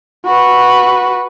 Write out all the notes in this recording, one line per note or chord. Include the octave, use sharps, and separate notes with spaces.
F#4 B4